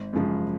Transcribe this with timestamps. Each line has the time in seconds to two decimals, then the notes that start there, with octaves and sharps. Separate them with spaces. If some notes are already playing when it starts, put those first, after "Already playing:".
Already playing: G#1
0.13 F#2 C#3 F3 G#3